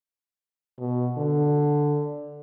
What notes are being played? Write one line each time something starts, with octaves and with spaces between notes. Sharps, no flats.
B2
D3